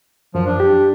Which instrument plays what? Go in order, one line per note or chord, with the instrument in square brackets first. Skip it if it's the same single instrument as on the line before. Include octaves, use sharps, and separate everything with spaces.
[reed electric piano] F#2 [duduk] F3
[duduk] D4
[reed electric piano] G4